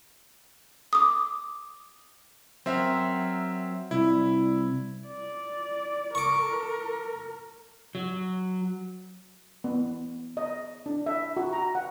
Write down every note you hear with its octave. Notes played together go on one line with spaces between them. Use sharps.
D6 D#6
F#3 C4 A#4 E5
C2 E4
D5
A#4 C#6 D6
F#3
B3
D#5
D4
E5
F#4
A#5
F#5